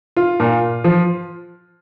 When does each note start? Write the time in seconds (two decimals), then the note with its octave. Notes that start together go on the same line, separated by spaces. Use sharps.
0.16 F4
0.40 A#2
0.84 F3